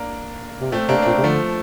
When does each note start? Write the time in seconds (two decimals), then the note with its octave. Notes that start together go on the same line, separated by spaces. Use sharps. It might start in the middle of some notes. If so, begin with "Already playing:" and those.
Already playing: A#3 D4
0.61 C3
0.72 A#2 A3 C4
0.89 C3 A#3 D4
1.02 D4
1.06 A#2 A3 C4
1.18 C3
1.23 D3 F3 A3